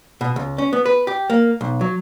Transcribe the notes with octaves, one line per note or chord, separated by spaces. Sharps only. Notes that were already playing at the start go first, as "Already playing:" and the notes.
B2
C#2
C#4
B3
B4
G4
A#3
B1
F#3